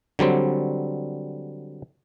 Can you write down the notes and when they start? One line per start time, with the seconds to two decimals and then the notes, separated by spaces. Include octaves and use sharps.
0.19 D3 F#3 G3 C4